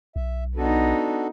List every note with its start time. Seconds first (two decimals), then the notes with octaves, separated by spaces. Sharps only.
0.16 B1 E5
0.57 B3 D4 D#4 F#4 A4